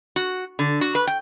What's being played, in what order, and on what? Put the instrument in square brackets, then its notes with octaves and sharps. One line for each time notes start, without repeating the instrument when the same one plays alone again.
[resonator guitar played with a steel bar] F#4
D3
F#4
B4
G5